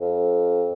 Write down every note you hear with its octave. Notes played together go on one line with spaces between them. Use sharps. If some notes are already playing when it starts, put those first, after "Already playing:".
F2